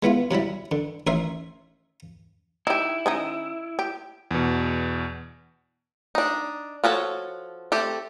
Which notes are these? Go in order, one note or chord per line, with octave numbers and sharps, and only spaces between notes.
G#3 B3 E4 F4
C3 F#3 G3 E4
D3
A1 D#3 A#4 C5 E5 C6
D#4 E4 G4
D#3 C#4 D#4
G4
E2 B2
D4 D#4
F3 F#4 A4 C#5
A3 C4 G4 A4